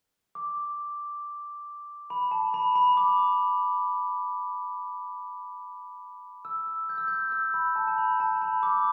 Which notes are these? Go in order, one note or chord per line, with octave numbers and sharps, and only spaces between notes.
D6
B5
A5
B5
B5
D6
E6
G6
E6
G6
E6
B5
A5
A5
B5
A5
B5
D6